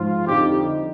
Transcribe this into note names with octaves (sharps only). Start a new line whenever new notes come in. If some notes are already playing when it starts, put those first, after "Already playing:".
Already playing: G#2 F3 F4
F2 D3 G3 C4 D#4 G4